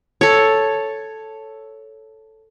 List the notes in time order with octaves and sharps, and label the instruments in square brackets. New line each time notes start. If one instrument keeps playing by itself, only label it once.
[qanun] A4 C#5